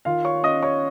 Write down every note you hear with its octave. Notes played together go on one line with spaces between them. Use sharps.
D#3 F4 F5
C#5 C#6
C#4 D#5 D#6
C#5 C#6